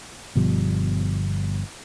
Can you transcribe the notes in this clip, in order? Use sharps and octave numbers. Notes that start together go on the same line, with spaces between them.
G1 B2 F3 G3